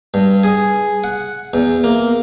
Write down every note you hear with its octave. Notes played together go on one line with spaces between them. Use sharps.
G2
G#4
F#5
E2
A#3